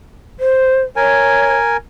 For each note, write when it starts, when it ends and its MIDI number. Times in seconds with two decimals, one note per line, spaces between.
0.40 0.82 72
0.96 1.77 70
0.96 1.55 73
0.96 1.77 80